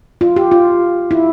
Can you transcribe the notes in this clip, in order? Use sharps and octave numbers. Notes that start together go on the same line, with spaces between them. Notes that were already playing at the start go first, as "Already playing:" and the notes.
F4
G4
F4
E4